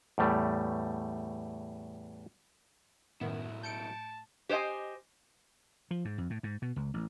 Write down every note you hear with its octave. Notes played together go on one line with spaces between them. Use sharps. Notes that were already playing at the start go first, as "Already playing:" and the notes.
E2 A2 G3 A3
B1 F#2 A2 D#3 B3 E4
A5 G6 C#7 D7
G4 C5 C#5 D#5 G#5
F3
G#2
F2
A2
G#2
B2
C#2
A1